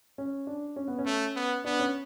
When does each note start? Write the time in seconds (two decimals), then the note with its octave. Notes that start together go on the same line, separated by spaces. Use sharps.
0.18 C#4
0.47 D4
0.76 C#4
0.88 B3
0.99 C#4
1.05 A3
1.36 B3
1.64 B3 D4
1.79 C#4